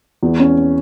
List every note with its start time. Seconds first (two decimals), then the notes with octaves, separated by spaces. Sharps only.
0.23 E2
0.39 C#4